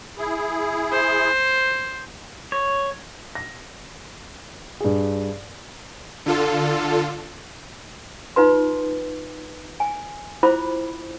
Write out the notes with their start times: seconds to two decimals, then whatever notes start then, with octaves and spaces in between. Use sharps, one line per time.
0.18 E4 G#4
0.92 C5
2.52 C#5
3.35 A#6
4.80 G2 G#4
6.26 D3 F4 A4
8.36 D#4 F4 B4 C6
9.80 G#5
10.43 E4 F4 C5 B5 D6